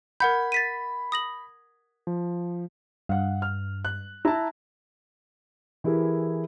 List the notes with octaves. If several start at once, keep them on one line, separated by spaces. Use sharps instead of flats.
A#4 F#5 B5 G6 G#6
A6 B6 D#7
D#6 A#6 F#7
F3
G2 F5 F#5
F6
F#6
E4 A5 A#5
E3 E4 G4 G#4 A#4